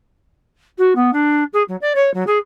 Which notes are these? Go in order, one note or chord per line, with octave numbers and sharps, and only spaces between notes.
F#4
B3
D4
G#4
F#3
D5
C#5
F#3
G#4